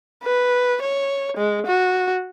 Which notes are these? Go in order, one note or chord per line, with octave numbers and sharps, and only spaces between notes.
B4
C#5
G#3
F#4